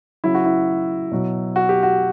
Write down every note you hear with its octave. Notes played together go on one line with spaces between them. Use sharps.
C#3 F#3 E4
F#4
E4
B2 F#3
F#4
G4
F#4